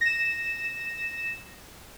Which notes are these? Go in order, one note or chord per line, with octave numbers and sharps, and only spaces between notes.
A#6 E7